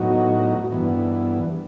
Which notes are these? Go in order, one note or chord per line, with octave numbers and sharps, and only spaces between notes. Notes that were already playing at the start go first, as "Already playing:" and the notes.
Already playing: A2 F#3 B3 D#4 F#4
G2 E3 B3